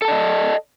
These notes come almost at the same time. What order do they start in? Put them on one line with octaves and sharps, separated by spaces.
A4 A5 D5 D#5